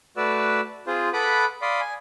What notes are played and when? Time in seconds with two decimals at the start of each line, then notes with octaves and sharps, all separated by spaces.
0.17 A3 F#4 B4 D5 E6
0.87 C4 F4 G#4 C5
1.13 A4 B4 F#5 B5 D6 D#6
1.62 D5 F5 B5 C6 D#6
1.81 G#5